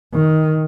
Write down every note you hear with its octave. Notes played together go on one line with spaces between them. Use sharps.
D#3